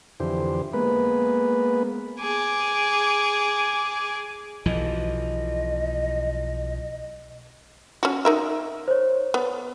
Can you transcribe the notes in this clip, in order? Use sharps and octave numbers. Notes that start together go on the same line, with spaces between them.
F2 D3 E3 G4 C5
G#3 A#3 B3 B4
G#4 D6
B1 E3 F3 D#5
C#4 F#4
D#4 A#4 E5
C5 C#5
B3